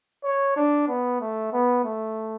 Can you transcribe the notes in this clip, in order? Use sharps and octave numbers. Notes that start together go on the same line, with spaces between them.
C#5
D4
B3
A3
B3
A3